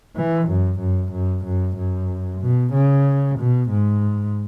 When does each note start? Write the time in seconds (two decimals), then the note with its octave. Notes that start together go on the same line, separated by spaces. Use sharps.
0.16 E3
0.48 F#2
0.79 F#2
1.12 F#2
1.45 F#2
1.76 F#2
2.41 B2
2.73 C#3
3.38 B2
3.70 G#2